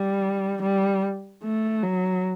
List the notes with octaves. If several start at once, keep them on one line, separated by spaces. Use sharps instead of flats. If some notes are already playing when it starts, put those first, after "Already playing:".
Already playing: G3
G3
A3
F#3